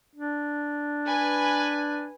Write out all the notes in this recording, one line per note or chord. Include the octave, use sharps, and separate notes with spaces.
D4
B4 G#5